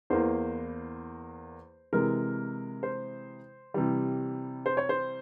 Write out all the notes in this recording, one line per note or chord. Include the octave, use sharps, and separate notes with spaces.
E2 E3 A#3 C5
C3 E3 G#3 A#4
C5
C3 E3 G3
C5
C#5
C5